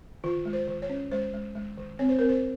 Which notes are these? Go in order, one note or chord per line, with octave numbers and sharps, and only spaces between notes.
D#3 F4
G#3
C5
D#3
C#5
C#4
G#3 C5
G#3
G#3
D#3
C4 C#5
C5
C4 A#4
C5